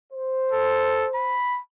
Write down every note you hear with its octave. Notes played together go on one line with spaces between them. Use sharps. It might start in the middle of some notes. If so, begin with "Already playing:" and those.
C5
A4
B5